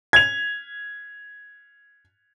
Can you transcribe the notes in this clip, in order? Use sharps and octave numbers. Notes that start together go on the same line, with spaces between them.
G#6 F7